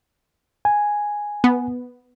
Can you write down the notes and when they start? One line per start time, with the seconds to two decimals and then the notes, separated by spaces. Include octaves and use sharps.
0.65 G#5
1.44 B3